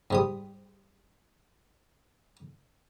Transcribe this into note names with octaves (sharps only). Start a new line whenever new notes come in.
G#2 G3 D#6